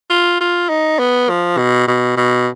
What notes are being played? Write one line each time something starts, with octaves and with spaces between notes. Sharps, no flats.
F4
F4
D#4
B3
F3
B2
B2
B2